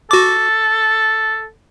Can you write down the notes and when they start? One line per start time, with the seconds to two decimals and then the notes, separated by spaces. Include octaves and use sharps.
0.11 F#4 A4 D6